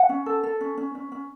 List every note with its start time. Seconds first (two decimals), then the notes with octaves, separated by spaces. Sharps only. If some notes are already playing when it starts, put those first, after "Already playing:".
Already playing: F#5
0.09 C#4
0.26 A4
0.43 A4
0.61 C#4
0.77 C#4
0.95 C#4
1.12 C#4